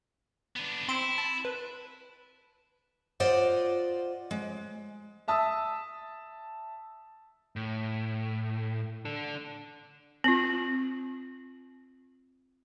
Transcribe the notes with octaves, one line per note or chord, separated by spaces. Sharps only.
B3 D4
C4 E4 C6 D7
A5
B4
F4 C5 D5 D#5 F#5
G#3
E5 A5 D#6 E6
A2
D4 A4
C4 F4